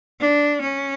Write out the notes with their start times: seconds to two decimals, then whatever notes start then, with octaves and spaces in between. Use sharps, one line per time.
0.20 D4
0.62 C#4